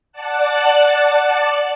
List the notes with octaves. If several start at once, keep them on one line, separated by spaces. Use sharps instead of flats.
D5 F#5 A5 F#6